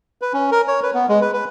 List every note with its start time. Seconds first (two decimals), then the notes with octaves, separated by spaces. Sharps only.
0.22 B4
0.34 C#4
0.51 A#4
0.68 C#5
0.83 B4
0.94 B3
1.09 G#3
1.21 B4
1.34 B4